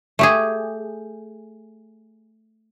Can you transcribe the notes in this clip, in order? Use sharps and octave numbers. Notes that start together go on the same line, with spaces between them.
A3 G4 G#4